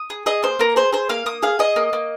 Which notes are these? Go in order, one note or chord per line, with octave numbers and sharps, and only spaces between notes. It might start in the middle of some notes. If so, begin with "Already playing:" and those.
Already playing: D#6
G#4
G#4 D#5
A#3 C5
A#3 A#4
G#4 C5
G#4 C5
A#3 F5
A#3 D#6
G#4 F5
G#4 D#5
A#3
A#3